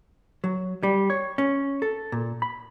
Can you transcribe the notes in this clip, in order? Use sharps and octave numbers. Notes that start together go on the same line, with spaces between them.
F#3
G3
C#5
C#4
A4
A#2
B5